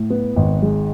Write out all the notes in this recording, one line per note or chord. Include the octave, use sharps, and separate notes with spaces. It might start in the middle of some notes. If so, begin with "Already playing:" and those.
Already playing: A2
B3
G#1
G#3